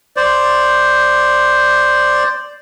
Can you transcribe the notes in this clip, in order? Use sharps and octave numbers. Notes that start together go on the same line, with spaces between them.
C5 D5